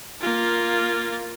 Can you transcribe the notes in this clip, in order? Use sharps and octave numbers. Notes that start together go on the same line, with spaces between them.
A#3 F4